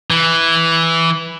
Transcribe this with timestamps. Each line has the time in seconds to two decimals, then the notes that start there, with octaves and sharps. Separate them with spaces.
0.11 E3